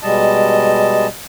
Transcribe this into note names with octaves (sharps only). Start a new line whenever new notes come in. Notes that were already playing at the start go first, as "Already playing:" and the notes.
B2 G3 G#3 D#5 A5